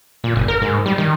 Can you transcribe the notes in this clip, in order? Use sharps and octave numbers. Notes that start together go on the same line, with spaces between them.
A#2
F#1
A#4
G#2
G3
D#3